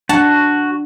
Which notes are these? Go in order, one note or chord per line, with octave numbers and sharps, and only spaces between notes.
D4 F#4 F#5 A5